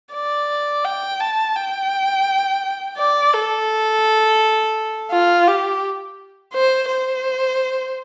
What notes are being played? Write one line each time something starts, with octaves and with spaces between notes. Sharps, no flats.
D5
G5
A5
G5
D5
A4
F4
G4
C5
C5